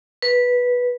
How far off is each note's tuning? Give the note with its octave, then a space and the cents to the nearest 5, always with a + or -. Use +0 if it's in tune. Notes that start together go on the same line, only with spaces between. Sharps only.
B4 -10